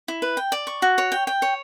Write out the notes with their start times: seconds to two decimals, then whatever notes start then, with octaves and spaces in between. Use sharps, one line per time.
0.08 E4
0.22 B4
0.37 G5
0.52 D5
0.67 C#6
0.82 F#4
0.98 C#5
1.12 G5
1.27 G5
1.42 C#5